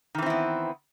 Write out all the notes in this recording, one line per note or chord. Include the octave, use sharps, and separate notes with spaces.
D#3 E3 B3 C4 E4